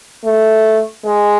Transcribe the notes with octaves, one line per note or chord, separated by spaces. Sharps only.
A3
G#3